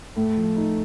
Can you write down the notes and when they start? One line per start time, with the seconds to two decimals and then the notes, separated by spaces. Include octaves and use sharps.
0.17 A2 A3
0.37 F3
0.57 D#4